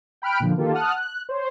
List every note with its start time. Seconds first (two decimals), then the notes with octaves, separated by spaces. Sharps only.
0.22 G5 B5 F6 F#6 D7
0.40 A#2 D3 F3
0.57 D#3 A#3 F4 G4 A4
0.74 F#5 A5 D#6 F6 F#6
0.96 F#6
1.29 C5 C#5